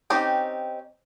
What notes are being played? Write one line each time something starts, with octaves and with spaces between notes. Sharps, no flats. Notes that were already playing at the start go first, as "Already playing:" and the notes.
C4 C#4 D#4 G4 D#5